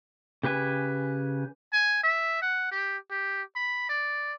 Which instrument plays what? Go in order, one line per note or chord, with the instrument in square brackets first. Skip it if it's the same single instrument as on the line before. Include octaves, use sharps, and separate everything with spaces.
[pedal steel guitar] C#3 G4 B4 G#5
[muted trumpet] G#5
E5
F#5
G4
G4
B5
D5